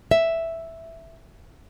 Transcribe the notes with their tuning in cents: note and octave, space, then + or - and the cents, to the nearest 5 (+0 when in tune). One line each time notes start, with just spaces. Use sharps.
E5 +0